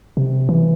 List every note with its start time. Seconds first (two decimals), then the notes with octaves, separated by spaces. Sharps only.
0.17 C3
0.49 E3